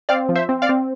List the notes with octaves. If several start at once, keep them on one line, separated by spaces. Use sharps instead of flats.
C4 D5 F5
F3
C5 E5
C4
D5 F5
C4